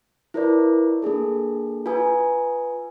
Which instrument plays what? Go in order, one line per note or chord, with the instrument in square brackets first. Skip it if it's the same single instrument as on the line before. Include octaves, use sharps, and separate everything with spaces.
[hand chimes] E4 F4 A#4 B4 C#5 D5
A#3 D4 G#4 A4
F4 B4 G#5 D#6